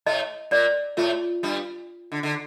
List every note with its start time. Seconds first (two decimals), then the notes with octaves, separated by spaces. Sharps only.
0.06 A2 A3 D#5
0.51 A#2 A#3 D5
0.97 A2 A3 F4
1.43 G2 G3
2.12 D3
2.23 D3